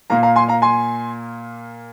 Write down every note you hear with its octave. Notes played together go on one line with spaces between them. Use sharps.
A#2 A#3 F5 A#5
F5 A#5
G#5 C6
F5 A#5
G#5 C6